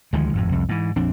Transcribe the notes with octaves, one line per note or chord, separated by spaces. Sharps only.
D2 D#3 F3 G#3
G#1 F2 A2
C2 F2
G#2 E3
A#1 F2 C4 D4